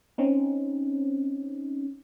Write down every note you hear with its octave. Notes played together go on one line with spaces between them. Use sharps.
C4 C#4 D#4